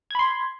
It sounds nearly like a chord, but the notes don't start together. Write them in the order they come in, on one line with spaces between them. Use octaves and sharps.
G#6 B5 C6